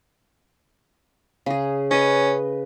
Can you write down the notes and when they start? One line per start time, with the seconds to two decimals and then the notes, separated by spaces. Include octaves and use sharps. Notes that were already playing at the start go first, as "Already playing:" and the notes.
1.46 C#3 G#4
1.91 C#4 B4 D#5